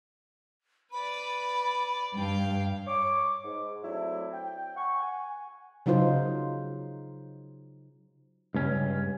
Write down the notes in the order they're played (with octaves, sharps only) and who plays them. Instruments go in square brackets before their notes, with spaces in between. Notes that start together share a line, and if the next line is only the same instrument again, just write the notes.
[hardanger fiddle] B4 D5 [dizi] B5
[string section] G2 [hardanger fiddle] F5 G5
[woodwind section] C#5 D6
G#2
F#3 A3 C4 D4 E4
G5
F#5 G#5 C#6
F#5 G#5
[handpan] C#3 F#3 D#4 F4 C5
[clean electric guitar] C#2 G2 C#4